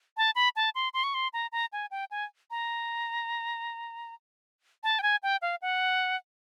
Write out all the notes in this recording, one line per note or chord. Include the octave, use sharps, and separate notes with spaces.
A5
B5
A5
C6
C6
C#6
C6
A#5
A#5
G#5
G5
G#5
A#5
A5
G5
G#5
G5
F5
F#5